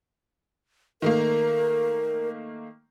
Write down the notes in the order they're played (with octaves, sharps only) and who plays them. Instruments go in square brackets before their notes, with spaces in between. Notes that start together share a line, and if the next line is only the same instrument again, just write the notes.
[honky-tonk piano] D#3 A3 A#3 [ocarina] A#4